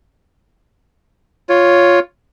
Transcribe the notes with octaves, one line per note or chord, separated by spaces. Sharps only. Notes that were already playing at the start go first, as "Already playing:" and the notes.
F4 C#5